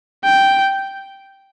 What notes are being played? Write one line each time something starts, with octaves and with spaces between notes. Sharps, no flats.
G5